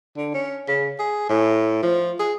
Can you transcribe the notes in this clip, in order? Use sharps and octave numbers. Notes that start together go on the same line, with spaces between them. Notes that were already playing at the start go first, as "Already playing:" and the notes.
D3
C#4
C#3
G#4
A2
F3
G#4